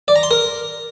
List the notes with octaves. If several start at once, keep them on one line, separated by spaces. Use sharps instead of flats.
D5
A#5
C6
A#4